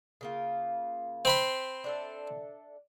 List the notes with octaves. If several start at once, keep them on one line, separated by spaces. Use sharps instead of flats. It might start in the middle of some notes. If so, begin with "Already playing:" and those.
C#3 A#3 F4
C4 B5 C6
D4 A4 E5